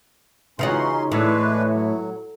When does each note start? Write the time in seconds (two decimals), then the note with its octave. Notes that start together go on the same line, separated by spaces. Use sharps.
0.59 C#3 E3 C#4 D#4 F4 F#4 C#5 C6
1.12 A2 E3 G#3 D4 E4 B4 C#5
1.71 F#3